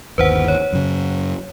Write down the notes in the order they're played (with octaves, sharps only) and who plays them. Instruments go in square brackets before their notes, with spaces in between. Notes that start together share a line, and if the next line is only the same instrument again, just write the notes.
[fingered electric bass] G1 D#2 [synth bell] B4 C5 F#5
[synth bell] C#5
[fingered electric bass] F#2 C#3